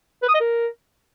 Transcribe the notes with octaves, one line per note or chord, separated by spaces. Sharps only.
B4
D#6
D#5
A#4